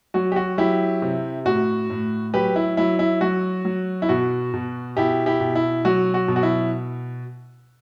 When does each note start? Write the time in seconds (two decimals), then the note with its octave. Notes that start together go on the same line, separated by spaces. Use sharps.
0.14 F#3 F#4
0.32 G4
0.36 F#4
0.58 F#3 E4 G4
1.02 C3
1.45 A2 F#4
1.90 A2
2.34 F#3 G4 B4
2.56 E4
2.77 F#3 E4
2.99 E4
3.21 F#3 F#4
3.65 F#3
4.02 E4
4.09 B2 F#4
4.54 B2
4.97 B2 E4 G4
5.26 E4 G4
5.40 B2
5.55 E4
5.85 F#3 F#4
6.14 F#4
6.28 B2
6.36 F#4
6.43 E4